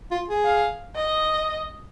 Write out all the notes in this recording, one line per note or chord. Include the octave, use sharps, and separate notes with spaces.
F4
G#4
F5
D#5